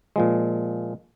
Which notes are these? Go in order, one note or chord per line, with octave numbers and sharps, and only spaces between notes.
A#2 F3 G#3